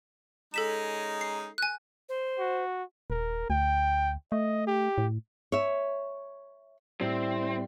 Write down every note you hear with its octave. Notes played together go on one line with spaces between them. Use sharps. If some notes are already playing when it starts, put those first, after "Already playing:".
G#3 C#4 D#4 A4 B6 E7
C7
G#5 F#6
C5
F#4
D#1 A#4
D2 G5
A3 D#5
G4
A2
C#5 E5
A2 G3 C4 E4 E6